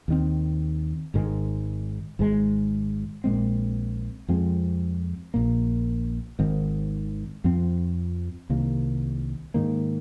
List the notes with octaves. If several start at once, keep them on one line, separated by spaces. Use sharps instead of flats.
D#2 D#3 C4
G#1 G#2 D#3 G#3
G#1 G#2 G#3
A#1 A#2 G#3 C4
F2 F3 G#3 C4
A#1 A#2 A#3
G#1 G#2 D#3 C4
F2 F3 C4
C2 C3 D#3 A#3
G#2 D#3 A#3